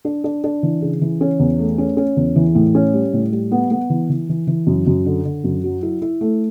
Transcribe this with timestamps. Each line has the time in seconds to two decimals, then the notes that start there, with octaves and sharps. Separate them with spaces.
0.05 D4
0.24 D4
0.44 D4
0.63 E3
0.82 C#3
1.01 E3
1.21 C#4
1.40 E2
1.59 A3
1.78 C#4
1.97 C#4
2.17 E2
2.36 E3
2.55 A2
2.75 C#4
2.94 G3
3.13 A2
3.32 G3
3.52 B3
3.71 B3
3.90 E3
4.10 E3
4.29 E3
4.47 E3
4.67 F#2
4.87 F#2
5.05 D3
5.25 D3
5.44 F#2
5.64 F#3
5.83 E4
6.02 E4
6.21 A3